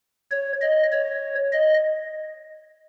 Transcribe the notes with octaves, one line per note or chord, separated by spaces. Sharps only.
C#5
D#5
C#5
D#5